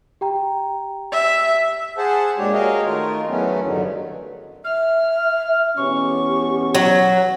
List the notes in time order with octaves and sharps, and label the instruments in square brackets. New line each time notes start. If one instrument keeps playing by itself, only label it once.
[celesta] G4 G5 A#5
[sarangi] E5
[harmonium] G#4 C5 F#5 A5
A#2 G#3 D4 G4 C#5
F#4 G#4 A#4 C#5 D#5 F5
D#3 A3 F4 A#4
E2 F#3 A3 B3 C#4
G2 D3 D#3 F#3
[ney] E5 [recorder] F6
[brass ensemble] E2 B2 C#4 [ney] G4 [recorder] C#6
[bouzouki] F#3